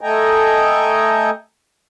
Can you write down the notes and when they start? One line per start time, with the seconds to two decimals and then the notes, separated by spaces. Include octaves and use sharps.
0.01 A3 A4 D#5 G5 G#5 A#5